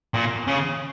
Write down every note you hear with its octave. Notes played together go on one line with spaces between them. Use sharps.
A#2
C#3